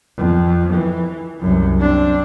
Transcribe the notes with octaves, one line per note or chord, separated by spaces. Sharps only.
F2
E3
C2 F#2
C4 D4